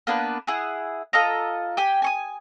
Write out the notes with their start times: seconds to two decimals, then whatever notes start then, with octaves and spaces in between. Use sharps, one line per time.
0.07 A#3 B3 D4 B4
0.47 E4 G#4 F#5
1.13 F4 A4 D#5 A#5
1.77 G4 G5 G#5
2.02 G#5 C#6 D#6